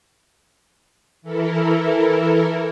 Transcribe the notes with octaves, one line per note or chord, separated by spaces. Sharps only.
E3 E4 A4 A#4